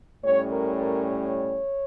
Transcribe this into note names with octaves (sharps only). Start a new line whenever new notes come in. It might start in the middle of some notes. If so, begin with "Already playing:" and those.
A2 G3 C#4 C#5
A#4
A#4
C#5